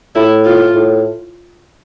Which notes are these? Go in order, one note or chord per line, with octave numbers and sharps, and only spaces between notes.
A2 E4
F4
A2